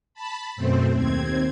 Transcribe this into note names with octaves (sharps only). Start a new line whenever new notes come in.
A5 B5
F#2 B2 A3 C4 C5
D#2 C4 G#6